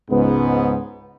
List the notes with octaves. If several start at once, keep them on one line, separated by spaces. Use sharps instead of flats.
C#2 G#2 B3